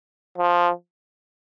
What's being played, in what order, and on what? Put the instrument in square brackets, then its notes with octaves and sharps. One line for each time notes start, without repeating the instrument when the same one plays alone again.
[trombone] F3